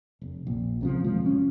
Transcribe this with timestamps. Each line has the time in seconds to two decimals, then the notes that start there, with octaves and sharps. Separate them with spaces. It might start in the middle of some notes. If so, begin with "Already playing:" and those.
0.22 F1
0.47 A#1
0.81 C#2 C3 F3
1.04 E1 D#2 F3 G#3
1.25 F1 C#4